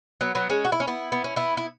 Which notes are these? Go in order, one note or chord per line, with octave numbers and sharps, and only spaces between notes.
F#3 B3
F#3 B3
G#3 C#4
F#4
E4
C#4
B3 E4
B3
C#4
B3 E4
E4